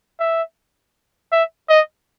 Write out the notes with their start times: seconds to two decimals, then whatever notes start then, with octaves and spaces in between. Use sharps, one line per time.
0.20 E5
1.32 E5
1.69 D#5